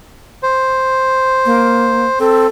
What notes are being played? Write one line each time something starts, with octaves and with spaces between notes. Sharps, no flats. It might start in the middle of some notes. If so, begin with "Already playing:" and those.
C5
A#3
C4 A4